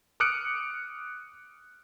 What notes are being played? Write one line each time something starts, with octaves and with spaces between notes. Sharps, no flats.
D6 D#6 F6 F#6 C#7 D7